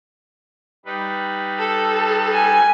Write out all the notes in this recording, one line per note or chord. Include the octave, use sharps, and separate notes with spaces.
G3 D#4 B4
A4
G#5